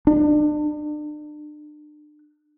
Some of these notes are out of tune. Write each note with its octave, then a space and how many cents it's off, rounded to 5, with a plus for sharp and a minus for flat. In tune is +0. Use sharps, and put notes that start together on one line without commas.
D4 +35